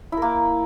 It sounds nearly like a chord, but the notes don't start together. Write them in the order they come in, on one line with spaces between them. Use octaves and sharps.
E4 A#4 A#3